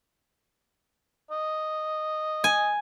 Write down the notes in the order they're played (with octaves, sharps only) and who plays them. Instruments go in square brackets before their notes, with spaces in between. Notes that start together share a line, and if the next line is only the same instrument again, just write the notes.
[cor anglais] D#5
[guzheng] G#5